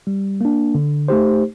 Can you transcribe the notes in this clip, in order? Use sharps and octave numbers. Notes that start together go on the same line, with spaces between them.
G3
A#3 D4
D3
A3 D#4 G4 C5